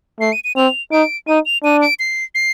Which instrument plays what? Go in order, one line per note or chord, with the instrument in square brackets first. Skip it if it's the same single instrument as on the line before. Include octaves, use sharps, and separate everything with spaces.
[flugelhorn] A3 [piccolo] C7
[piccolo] D#7
D#7
[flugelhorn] C4 [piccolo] F7
[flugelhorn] D#4 [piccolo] D7
[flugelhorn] D#4 [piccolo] D#7
[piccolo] F7
[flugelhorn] D4 [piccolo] D#7
[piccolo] D7
C7
C7